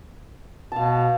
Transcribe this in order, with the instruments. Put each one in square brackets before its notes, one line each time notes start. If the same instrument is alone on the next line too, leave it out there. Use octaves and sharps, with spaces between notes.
[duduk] B2 [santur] F5 A5